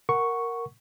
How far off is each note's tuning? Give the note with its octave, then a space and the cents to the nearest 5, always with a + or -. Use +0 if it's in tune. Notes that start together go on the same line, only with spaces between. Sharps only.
A#4 +0 F#5 +0 C#6 +0